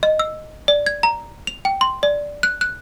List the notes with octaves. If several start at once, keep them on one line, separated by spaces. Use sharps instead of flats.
D#5
E6
D5
G#6
A#5
F7
G5
C6
D5
F#6
F#6